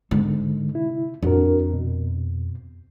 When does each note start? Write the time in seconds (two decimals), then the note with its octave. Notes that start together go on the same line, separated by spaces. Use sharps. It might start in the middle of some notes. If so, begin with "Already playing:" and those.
0.11 G#2 D3 G#3 D#4
0.75 C3 E4
1.23 F2 D4 F#4 A#4
1.73 B2